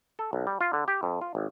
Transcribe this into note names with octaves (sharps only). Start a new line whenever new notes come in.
A4
B1
G3
F4
D3
G4
F2
F4
G#1